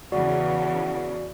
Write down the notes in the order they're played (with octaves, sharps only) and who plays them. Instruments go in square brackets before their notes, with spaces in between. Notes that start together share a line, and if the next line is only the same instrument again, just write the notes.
[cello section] E2 C#3 E3 [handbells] F#4 D5 [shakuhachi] F#5